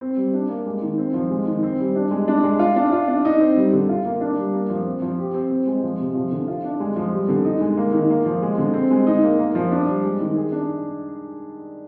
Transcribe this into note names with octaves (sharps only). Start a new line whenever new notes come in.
C4
G3
D4
A#3
G#3
D#3
C4
F3
G#3
D#3
C4
G3
D4
G#3
D4
G#3
F4
D4
F4
D4
D#4
C4
G3
D3
F4
A#3
D4
G3
A#3
F3
C4
F3
G4
C4
C4
G#3
F3
C3
F3
D3
F4
D4
G#3
F3
G3
D3
D#4
G#3
A#3
D#3
A#3
F3
G#3
D3
C4
G#3
D#4
A#3
A#3
F3
D4
G3
G#3
D#3
G#4
D4